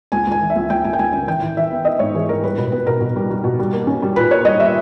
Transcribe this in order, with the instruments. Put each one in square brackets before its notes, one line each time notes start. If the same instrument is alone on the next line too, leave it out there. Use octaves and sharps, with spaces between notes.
[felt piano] C#2 G#5
C#2 G#5
E3
E5
C#2
C#2 G5
C#2 G#5
G5
C#2 G#5
C#3 G#5
E3 G5
E3
E3 E5
B3
B3 D#5
G#2 C#5
E3 G#4
G#2 A#4
G3 B4
B2 B4
B3 B4
B2 A#4
B2
G3
G3
B2
G3
A#3
C#4
G3
A#2 B4
A#3 C#5
G3 D#5
G3 E5